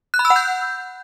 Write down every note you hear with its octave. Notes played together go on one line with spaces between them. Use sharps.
F#6
B5
E6
F#5
G6